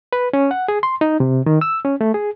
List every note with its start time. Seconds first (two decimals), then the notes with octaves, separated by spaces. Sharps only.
0.13 B4
0.33 C#4
0.51 F#5
0.68 G#4
0.83 C6
1.01 D#4
1.20 C3
1.46 D#3
1.61 E6
1.85 C#4
2.01 A3
2.14 G#4